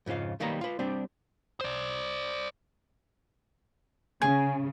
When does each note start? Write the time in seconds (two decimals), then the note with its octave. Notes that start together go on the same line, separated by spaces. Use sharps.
0.06 F2 G#2 C#3 F4 F5
0.40 B1 D#3 G3 A#3 B4 A#5
0.61 F4 B4
0.79 G3 C4 D4 G4
1.61 C5 D5
4.22 C#3 G#4